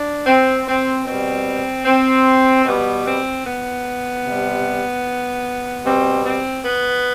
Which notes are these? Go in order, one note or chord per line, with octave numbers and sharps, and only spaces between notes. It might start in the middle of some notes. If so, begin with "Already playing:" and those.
Already playing: D4
C4
C4
B2 G3 C4
C4
B2 G3 B3
C4
B3
C3 G3
B2 G3 C4
C4
B3